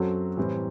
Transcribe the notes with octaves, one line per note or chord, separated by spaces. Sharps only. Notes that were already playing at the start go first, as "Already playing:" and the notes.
Already playing: F#2 F#3 C4 F#4 A4
A2 E3 G3 C4